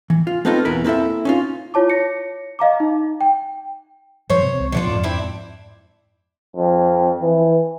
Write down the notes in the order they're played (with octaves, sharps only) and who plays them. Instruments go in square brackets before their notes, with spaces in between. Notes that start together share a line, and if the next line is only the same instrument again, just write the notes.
[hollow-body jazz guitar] E3
F4
A3 B3 C4 D#4 F4 A4
E2 B2 E3 A#4 B5
A#3 C4 E4 A4 E5
C#4 D#4 F4
[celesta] E4 F4 C#5 A5 D6
C#5 A#6 C#7
D#5 F5 A#5 D6
D#4
G5
[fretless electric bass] G2 F3 F#3 [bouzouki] C5 C#5
[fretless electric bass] C3
C2
[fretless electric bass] A#2 F3 F#3 [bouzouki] D3 D4 F4
[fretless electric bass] F2 G#2
[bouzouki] C4 D4 E4
[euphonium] F2
E3